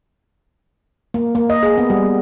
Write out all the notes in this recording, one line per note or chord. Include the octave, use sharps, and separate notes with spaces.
A#3
A#3
D#5
G#4
B3
G3